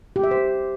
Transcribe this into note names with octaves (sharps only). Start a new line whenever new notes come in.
G4
E5
C5